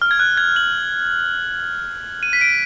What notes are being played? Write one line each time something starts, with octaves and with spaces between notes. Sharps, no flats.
F6
G#6
F#6
G#6
F#7
D#7
B6
D7